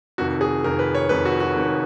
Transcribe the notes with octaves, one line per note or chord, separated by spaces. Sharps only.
F1 F2 D#3 F#4
G#4
F1 F2 D#3 A#4
B4
C#5
F1 F2 D#3 B4
F#4
F#4
F1 F2 D#3